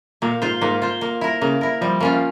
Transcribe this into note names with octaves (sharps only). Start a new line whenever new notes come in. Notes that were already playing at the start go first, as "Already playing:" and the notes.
A#2 A#3
G#2 F4 C5
G#2 A#3
F4 C5
A#3
E4 A#4
C#3 A#3
E4 A#4
F3 G3
A#3 C#4 F4